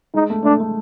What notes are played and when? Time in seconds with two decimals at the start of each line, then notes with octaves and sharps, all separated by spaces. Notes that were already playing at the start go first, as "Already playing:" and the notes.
0.14 G#3 D#4
0.30 A3
0.44 A3 D4
0.60 A3